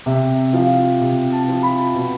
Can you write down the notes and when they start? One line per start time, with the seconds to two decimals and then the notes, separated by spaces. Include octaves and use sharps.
0.06 C3 E5
0.53 F3 F5
1.01 C3
1.31 A5
1.48 F3
1.63 B5
1.94 B2